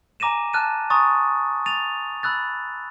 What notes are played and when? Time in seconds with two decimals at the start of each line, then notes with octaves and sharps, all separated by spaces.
0.20 G#5 A#5 D6 A#6 D#7 E7
0.53 A5 F6 F#6 A6 D#7
0.90 G#5 A#5 C6 C#6 D#6 A6
1.66 A6 D#7 F7
2.23 B5 E6 F#6 A6